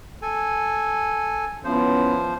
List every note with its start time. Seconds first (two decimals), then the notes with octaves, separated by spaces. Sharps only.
0.22 A4 G#5
1.64 F3 B3 C#4 E4 C5